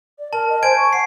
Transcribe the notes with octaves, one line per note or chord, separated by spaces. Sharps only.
D5
A#4 A5
D#5
C5 G#5 G#6 D7
C#6
F#5 C7